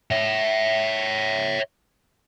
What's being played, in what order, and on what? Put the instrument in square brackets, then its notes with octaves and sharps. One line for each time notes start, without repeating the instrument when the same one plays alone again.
[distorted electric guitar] C#5 E5